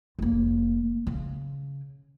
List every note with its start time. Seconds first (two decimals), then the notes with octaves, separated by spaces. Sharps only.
0.19 F1 A#3
1.07 C#3